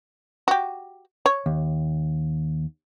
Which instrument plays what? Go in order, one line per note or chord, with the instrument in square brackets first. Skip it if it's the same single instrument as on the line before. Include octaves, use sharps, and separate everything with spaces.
[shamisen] F#4 G4
C#5
[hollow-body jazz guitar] D#2